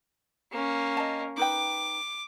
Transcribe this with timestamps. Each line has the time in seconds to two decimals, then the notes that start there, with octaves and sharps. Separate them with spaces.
0.51 A#3 C#4
0.97 D#5 A5
1.37 D#4 B4 G5 D6